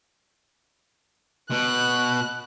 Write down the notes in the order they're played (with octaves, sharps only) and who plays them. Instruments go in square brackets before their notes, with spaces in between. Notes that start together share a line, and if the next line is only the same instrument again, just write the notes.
[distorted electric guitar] B2 [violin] F#6